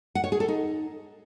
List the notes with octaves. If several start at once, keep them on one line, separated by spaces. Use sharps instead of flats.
F#5
C#5
G#4
A4
D#4